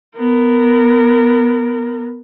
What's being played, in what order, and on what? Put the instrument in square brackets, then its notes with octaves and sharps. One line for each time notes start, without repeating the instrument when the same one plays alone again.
[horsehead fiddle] B3 A#4